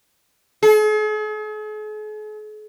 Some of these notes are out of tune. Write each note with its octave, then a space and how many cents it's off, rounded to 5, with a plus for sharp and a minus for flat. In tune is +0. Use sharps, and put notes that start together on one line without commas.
G#4 +45